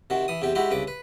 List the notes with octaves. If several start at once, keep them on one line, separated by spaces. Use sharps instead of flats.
C3 D#3 F#4
E3 D#6
E2 C3 G4
G#3 E4 F#4 G4
C2 C#3 B4 D6
B4